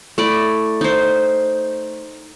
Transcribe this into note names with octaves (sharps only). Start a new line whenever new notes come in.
A3 E4 D5
D#4 C5